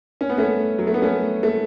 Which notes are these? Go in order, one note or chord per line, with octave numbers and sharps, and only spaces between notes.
C#4
B3
A3 C#4
F#3
A3
B3
A3 C#4
A3